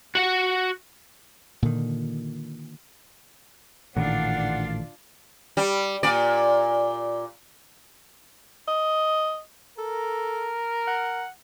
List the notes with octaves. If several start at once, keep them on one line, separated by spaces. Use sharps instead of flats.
F#4 F#5
A#2 D3 D#3
A1 A#2 D#3 D4 F4 F#5
G3
A#2 D5
D#5
A4 A#4
F#5